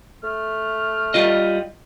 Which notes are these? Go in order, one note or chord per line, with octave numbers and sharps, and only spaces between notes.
A3 F6
G3 F4 D#5